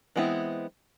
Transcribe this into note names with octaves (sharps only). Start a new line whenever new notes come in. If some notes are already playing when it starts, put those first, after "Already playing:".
E3 G#3 B3 C4 E4